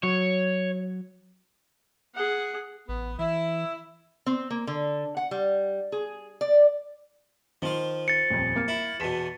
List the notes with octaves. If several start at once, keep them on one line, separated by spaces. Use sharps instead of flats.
F#3 C#5
G#4 F#5
A1 B3
E3 E4
C4
A#3
D3
F#5
G3
G#4
D5
D#3 F3 F4
A6 C#7
D#1 F2
A#3
E4
E2 B2 A5 B6 E7